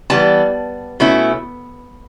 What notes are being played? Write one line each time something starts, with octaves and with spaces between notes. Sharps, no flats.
E3 G3 B3 A5
B2 A3 C#4 E4